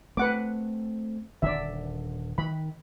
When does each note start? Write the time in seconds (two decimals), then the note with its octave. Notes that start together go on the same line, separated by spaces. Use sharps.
0.17 A3 C4 B4 F#5 D6
1.42 D#1 D3 D5 E5
2.38 D#3 B5